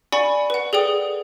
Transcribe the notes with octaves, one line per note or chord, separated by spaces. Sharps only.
D5 F#5 G#5 B5 C#6
B4 F#5
G#4 A4 D5 G5 D#6